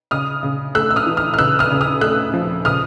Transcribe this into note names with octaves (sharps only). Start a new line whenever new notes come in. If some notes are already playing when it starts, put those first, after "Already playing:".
C#3 D#6 F6
C#3
A3 E6 F#6
E6
D#6 F6
E3
D#6 F6
F6
C#3 E6 F#6
D#6 F6
C#3
D#6 F6
A3 E6 F#6
F3
C#3 D#6 F6